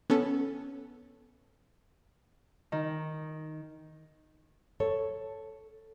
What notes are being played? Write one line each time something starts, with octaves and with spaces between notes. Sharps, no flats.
B3 C#4 A4
D#3
A4 C#5